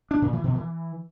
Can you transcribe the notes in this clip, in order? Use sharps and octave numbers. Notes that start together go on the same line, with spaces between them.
D4
A#2
E3
B2
E3